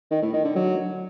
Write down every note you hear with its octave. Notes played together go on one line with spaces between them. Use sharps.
D#3
A2
D#3
D3
F#3